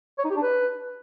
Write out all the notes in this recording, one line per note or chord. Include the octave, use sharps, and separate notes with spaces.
C#5
D#4
G4
D4
B4